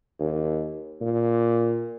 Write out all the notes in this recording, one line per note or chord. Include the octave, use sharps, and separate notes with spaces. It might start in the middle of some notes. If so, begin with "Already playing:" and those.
D#2
A#2